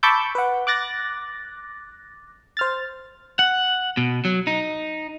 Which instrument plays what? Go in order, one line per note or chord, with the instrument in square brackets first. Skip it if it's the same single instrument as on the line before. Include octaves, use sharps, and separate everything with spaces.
[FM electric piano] A5 B5 C#6 D6 E6 G6
B4 F#5
D6 F#6 A6 A#6
C5 F6 A6
[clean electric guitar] F#5
B2
F#3
D#4